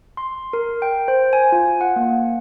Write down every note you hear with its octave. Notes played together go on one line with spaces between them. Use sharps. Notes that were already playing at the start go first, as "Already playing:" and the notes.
C6
A#4
G5
C5
G#5
F4
F#5
A#3